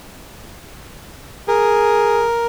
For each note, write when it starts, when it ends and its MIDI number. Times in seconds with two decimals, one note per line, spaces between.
1.48 2.26 68
1.48 2.47 70